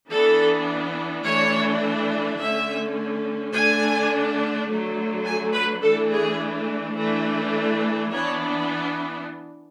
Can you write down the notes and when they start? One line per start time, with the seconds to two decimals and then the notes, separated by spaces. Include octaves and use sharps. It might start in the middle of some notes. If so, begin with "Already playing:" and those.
0.10 E3 B3 D4 A4
1.25 E3 A3 D4 C#5
2.39 D3 A3 C#4 E5
3.53 D3 A3 D4 G#5
4.67 D3 F#3 A3
5.25 G#5
5.53 B4
5.82 E3 A3 D4 A4
6.11 G#4
6.96 E3 A3 D4
8.11 E3 B3 D4 C#5